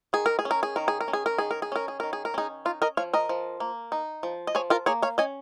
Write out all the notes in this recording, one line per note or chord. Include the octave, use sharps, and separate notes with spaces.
D#3 G#4
A#4
G#4
C#4
A#4
G#4
D#3 A#4
G#4
A#4
C#4
G#4
A#4
D#3 G#4
A#4
G#4
C#4 A#4
G#4
D#3 A#4
G#4
A#4
C#4 D#4 G#4
D#4 F4
A#4 D#5
F3 C#5 F5
A#4 D#5
F3
A#3
D#4
F3
D#5
F3 G#4 C#5
F4 A#4
A#3 G#4 C#5
C#5 F5
C#4 D#5 G#5